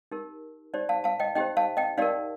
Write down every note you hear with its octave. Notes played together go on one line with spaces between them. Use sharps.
D#4 G4 A#4
D#4 G4 C5 D5
F5 A5
F5 A5
D#5 G5
D#4 G4 C5 D#5 G5
F5 A5
D#5 G5
D#4 G4 A#4 D5 F5